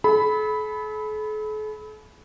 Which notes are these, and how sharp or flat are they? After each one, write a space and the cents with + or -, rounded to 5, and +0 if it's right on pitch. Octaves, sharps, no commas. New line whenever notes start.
A4 -45 B5 +0